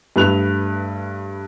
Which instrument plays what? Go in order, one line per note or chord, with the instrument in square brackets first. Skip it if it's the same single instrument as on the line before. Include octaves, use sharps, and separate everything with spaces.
[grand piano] G2 A3 B4 F#6 F7